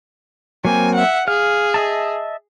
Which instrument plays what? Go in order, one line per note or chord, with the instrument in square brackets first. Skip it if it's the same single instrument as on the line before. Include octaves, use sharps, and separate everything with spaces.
[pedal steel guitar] F#3 A#3 C4 [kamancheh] G#5
[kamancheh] E5 F#5
[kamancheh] G#4 [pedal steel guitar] F5
[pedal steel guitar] D#5 E5 A5